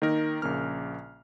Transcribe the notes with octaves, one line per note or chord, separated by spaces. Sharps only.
D#3 A#3 D#4 A#4
A#1 C#3 A#3 F6